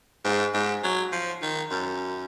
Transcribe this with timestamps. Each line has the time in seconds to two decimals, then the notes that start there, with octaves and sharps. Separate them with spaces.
0.25 G#2
0.54 G#2
0.83 F#3
1.13 F3
1.42 D#3
1.71 F#2